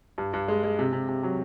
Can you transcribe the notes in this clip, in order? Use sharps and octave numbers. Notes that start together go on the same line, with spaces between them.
G2
G2
G#3
G#3
C3
C3
C3
F#3